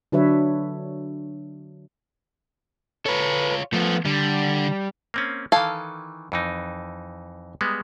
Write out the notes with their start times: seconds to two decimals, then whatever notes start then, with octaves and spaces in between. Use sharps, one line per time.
0.12 D3 F#3 D4 B4 C#5 E5
3.06 F4 A4 B4 C#5
3.73 F3 A3 B3
4.05 D3 G3
5.14 A#3 C4 C#4
5.52 D#3 E3 A4 F5 G#5
6.32 F2 E3 D#4
7.61 G3 G#3 B3